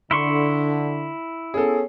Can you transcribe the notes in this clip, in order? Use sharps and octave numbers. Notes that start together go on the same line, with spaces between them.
D3 E4 C6 C#6
B3 C#4 G#4 A4